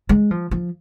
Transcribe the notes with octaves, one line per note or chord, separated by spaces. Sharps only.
G#3
F3
F3